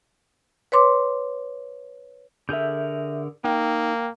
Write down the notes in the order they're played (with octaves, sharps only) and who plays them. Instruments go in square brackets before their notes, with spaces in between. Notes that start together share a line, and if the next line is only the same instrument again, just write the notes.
[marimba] B4 C#5 C6 D6
[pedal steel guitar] D3 G#4 A#4 [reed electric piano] E5 G6
[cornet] A#3 [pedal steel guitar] D#4 [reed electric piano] G5